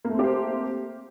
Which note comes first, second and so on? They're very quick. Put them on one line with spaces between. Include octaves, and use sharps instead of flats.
A#3 A3 C4 G4 C5